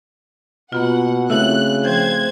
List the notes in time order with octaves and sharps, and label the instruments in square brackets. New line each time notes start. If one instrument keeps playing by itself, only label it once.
[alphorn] B2 [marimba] A#3 B3 F4 [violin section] F#5
[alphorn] C#3 [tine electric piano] A3 C4 [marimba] E4 F#4 C#5 [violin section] F#6
[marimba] F3 G5 G6 [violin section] C5 G#6